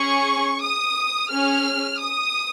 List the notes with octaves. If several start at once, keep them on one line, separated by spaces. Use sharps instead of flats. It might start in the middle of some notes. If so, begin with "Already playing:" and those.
Already playing: C#4 G#4 C#6
D#6
C#4 G#4 F6
D#6